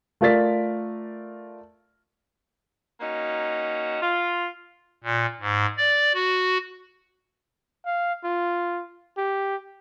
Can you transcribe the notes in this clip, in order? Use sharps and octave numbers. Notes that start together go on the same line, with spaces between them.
A3 F4 A#4 D5 A6 B6
A#3 C#4 D#4 F#4
F4
A#2
G#2
D5
F#4
F5
F4
G4